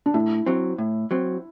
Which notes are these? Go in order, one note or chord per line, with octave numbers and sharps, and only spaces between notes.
D4
A2 E4
F#3 C4
A2
F#3 C4